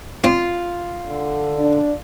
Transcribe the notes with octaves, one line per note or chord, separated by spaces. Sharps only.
C4 F4
D3
D4